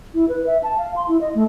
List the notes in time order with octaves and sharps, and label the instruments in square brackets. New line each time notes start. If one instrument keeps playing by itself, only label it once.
[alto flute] E4
B4
E5
A5
F5
C6
E4
D#5
A3